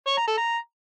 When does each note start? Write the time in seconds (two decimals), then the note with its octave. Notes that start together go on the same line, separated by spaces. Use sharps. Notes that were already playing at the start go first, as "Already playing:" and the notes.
0.07 C#5
0.17 A#5
0.27 A4
0.37 A#5